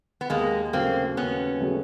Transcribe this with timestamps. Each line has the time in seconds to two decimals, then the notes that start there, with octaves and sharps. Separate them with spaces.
0.21 B3
0.30 D#2 G#3 A#3
0.73 C#3 F#3 A3 A#3 C4
1.17 D#2 B3 C#4
1.60 C#3 F#3 A3